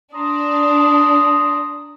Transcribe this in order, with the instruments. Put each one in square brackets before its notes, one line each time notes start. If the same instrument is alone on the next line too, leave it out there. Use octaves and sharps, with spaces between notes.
[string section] D4 [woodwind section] A#5 C6 D#6